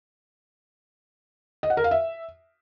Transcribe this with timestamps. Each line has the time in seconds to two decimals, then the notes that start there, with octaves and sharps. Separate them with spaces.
1.63 D#5
1.70 F#5
1.77 A#4
1.84 F5
1.91 E5